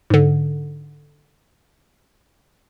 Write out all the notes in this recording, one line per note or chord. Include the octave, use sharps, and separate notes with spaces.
G#2 D3